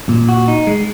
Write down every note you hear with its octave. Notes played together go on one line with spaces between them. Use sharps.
A#2
F#4
D#4
G#3